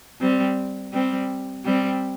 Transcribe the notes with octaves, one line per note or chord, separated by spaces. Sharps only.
G3 C4
G3 C4
G3 C4